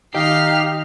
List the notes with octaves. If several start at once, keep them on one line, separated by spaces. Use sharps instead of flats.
D#3 D#4 G4 F5 F6 C7